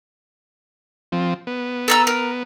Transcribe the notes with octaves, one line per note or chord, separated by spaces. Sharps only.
F3 C4
B3
A4 A#5 E6
A#4